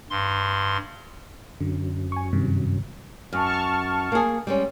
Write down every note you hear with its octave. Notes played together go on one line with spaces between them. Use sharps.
G2 C6
F#2 D3
G#5 C#6
G2 C3 D#3
F#2 A5 C#6 F6
A#3 G#4
G3 G#3 C#4